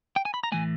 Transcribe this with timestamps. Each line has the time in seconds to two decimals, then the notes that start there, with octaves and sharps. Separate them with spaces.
0.16 G5
0.25 G#5
0.34 B5
0.44 A#5
0.52 A2 E3 A3 G#5